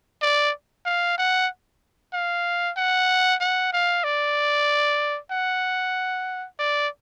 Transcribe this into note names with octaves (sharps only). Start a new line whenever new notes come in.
D5
F5
F#5
F5
F#5
F#5
F5
D5
F#5
D5